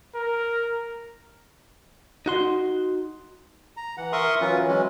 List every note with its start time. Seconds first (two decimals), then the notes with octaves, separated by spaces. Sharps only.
0.15 A#4
2.26 D#4 F#4 C6
3.77 A#5
3.97 E3 F#5
4.13 A#4 E5 C6 C#6 D#6
4.41 E3 F#3 C#4 F4 B4
4.68 E3 F#3 G#3 C#4